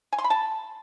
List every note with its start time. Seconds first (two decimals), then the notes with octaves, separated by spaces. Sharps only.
0.13 G#5
0.18 C6
0.24 B5
0.30 A5